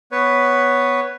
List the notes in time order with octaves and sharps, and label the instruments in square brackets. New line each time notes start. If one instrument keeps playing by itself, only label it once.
[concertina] B3 B4 C#5